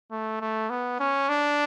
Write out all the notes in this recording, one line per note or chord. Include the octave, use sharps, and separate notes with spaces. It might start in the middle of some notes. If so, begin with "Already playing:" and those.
A3
A3
B3
C#4
D4